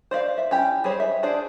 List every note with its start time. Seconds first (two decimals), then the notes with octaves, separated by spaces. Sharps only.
0.11 C5 D5 E5 F5
0.38 E5
0.51 C#4 E4 G4
0.84 G3 G#4 C5 C#5
1.00 E5
1.23 D4 G#4 C5 D5